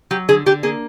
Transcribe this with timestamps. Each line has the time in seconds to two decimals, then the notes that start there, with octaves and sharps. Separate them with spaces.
0.11 F#3 G4
0.29 D3 G#4
0.46 D3 G4
0.63 A#3 G#4